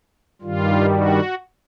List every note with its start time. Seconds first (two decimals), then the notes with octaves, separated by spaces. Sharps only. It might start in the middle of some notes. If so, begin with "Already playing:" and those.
0.42 G2 D#3 G3 F4
0.91 F#4